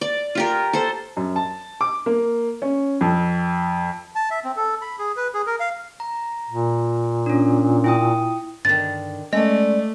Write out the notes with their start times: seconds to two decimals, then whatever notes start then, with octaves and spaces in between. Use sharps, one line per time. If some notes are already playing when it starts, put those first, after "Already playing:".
0.01 D5
0.35 F4 G4 A#4
0.73 A4 C5
1.17 F#2
1.36 A5
1.81 D6
2.06 A#3
2.62 C#4
3.01 F2
4.15 A5
4.31 E5
4.45 C4
4.56 A4
4.82 B5
4.99 G#4
5.17 B4
5.34 G#4
5.47 A#4
5.60 F5
6.00 A#5
6.49 A#2
7.26 C#4 D4
7.84 E4 G5 D#6
8.65 G2 D3 D#3 A6
9.33 G#3 A3 C#4 D5 D#5